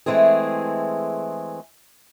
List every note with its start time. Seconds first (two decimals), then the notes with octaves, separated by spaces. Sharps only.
0.06 E3 G#3 A3 C4 G#4